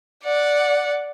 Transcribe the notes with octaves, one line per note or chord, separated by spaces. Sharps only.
D5 F#5